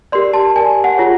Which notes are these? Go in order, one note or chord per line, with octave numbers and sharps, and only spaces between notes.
G4 A#4 D5 C6
A5
G4 A#4 D5 G#5
F#5
F4 G#4 C#5